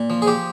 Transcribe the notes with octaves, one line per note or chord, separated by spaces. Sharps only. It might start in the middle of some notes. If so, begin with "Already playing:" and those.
Already playing: A#2
F3
G#4
F3 G4